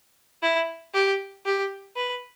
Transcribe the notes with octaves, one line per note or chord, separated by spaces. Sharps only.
E4
G4
G4
B4